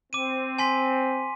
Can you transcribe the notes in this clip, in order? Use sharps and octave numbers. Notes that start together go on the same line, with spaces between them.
C4 D6 D#7
G#5 C6 B6